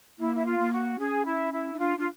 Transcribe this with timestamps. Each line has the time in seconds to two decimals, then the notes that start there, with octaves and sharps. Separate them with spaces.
0.19 A#3 E4
0.35 E4
0.46 F4
0.59 A#3
0.72 F#4
0.99 C#4 G#4
1.26 E4
1.52 E4
1.74 D#4
1.79 D4 F4
1.98 D4 F4